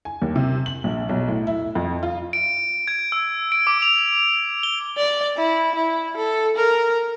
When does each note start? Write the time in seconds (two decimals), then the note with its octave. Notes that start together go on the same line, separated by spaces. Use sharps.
0.05 G#5
0.22 D#2
0.36 C3
0.66 F#7
0.84 A#1
1.09 B1
1.28 A2
1.47 E4
1.75 F2
2.03 F4
2.33 D7
2.88 G#6
3.12 E6
3.52 D7
3.67 D6
3.82 F7
4.63 G7
4.97 D5
5.37 E4
5.75 E4
6.17 A4
6.57 A#4